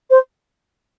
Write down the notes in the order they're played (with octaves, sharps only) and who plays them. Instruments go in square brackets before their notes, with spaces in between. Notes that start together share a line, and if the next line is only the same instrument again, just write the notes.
[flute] C5